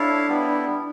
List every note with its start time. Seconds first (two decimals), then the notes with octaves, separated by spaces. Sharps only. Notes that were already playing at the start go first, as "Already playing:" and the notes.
Already playing: D4 E4 A4 C#5 F5
0.28 G3 B3 E4